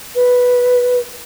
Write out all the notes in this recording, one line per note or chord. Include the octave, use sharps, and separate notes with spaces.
B4